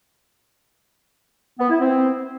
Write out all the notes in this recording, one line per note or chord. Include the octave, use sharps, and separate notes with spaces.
B3
E4
C4